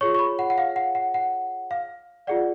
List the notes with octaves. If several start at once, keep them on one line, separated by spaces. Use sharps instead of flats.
F4 G#4 C#5 C#6
C#6
B5
F#5
F#5
F5
F#5
F#5
F#5
F5
F4 G#4 D5 F#5